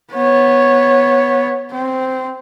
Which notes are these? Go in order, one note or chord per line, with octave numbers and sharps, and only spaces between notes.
B3 C#5
C4